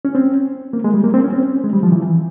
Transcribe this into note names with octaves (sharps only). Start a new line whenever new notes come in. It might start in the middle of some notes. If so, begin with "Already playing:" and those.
C#4
C4
A#3
G#3
G3
A#3
C4
C#4
C4
G#3
G3
F3
E3